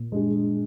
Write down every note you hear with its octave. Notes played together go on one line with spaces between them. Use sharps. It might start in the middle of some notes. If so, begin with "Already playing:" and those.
Already playing: A#2
G#3 D4 G#4